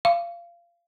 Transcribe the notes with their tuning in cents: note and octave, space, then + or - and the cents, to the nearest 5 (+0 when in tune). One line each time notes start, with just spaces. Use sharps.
F5 -25